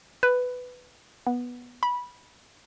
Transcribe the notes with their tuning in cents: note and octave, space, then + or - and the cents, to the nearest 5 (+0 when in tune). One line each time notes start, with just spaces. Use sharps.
B4 +10
B3 -10
B5 -15